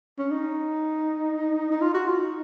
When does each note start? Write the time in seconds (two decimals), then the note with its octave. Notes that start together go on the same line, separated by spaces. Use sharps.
0.18 C#4
0.31 D#4
1.72 D#4
1.81 F4
1.94 F#4
2.07 F4
2.18 D#4